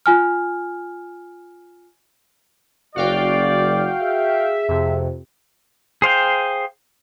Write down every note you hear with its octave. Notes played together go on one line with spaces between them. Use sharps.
F4 G#5 F6
F#1 F#4 D5 F5 G5
G#4 E5
F2 C3
G#4 C5 F5 G5